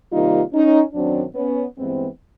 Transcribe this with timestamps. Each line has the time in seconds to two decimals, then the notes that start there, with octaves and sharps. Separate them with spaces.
0.12 C3 D#3 G3 A#3 D#4 F4
0.53 C#4 D#4
0.94 F#2 D#3 F#3 C4 D4
1.35 B3 C#4
1.78 G2 E3 G#3 B3 C4